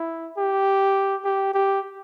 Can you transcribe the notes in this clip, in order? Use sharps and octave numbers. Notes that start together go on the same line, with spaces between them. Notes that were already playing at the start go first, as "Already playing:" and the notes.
Already playing: E4
G4
G4
G4